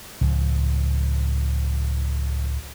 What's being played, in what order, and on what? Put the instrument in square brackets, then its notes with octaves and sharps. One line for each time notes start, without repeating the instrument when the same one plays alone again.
[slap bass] C#2 A2 F3